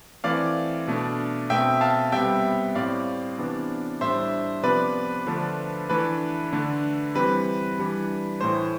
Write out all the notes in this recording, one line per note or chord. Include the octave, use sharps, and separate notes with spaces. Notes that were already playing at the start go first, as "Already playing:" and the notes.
E3 A3 C4 D5 F5
B2 A3 D4
B2 A3 C4 E5 G5
F5 A5
C3 G3 B3 E5 G5
A2 G3 C4 D5 F5
C3 E3 B3 D4
A2 G3 D4 C5 E5
C3 F3 B3 B4 D5
D3 F3 A3 D4
E3 A3 D4 B4
D3 A3 D4
E3 G3 C4 B4
E3 G3 D4
A2 E3 A3 C5